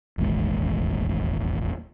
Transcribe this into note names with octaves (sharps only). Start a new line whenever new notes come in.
E1 A1 D#2 G#3